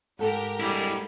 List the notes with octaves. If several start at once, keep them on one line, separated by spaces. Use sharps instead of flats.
G#2 G4 A4 A#4
G3 G#3 E4